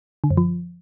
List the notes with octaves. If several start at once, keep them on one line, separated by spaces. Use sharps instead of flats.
D3
F#2
F3